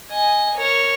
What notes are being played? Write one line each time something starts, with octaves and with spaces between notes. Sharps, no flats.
D#5 G#5
A#4 C#5